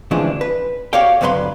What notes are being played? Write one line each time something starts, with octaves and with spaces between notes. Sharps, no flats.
D2 C#3 E3 F3 G#3 D4
B4
F#4 G4 C#5 D5 F5 G5
D2 G2 F#3 B4 B5 C6